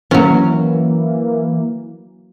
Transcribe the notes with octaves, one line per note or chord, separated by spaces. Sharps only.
E3 F#3 A#3 C#4